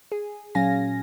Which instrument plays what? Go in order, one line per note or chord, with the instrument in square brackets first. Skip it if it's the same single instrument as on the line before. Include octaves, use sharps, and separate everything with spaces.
[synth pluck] G#4
A#2 F#3 C#4 F5 G#5 A#6